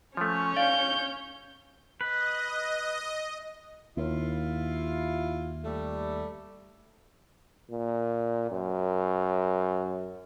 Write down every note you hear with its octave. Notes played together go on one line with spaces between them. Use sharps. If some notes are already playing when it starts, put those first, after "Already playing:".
F3 A3 C#4 C#5
D5 F5 G6
B4 D#5
D#2 E4 F4
G3 A3
A#2
F#2